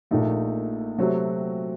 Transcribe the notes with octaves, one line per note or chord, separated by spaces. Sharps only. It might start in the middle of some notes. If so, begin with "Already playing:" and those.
A#1 A#2 A3 D#4
C3 F#3 A3 C4 F#4